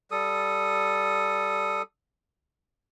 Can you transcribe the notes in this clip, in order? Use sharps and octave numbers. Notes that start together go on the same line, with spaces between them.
G3 A4 D#6